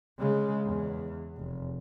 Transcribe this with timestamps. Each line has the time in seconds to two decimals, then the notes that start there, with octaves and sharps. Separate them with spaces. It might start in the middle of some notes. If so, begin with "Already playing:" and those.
0.19 C#3 G#3
0.65 E2
1.37 F1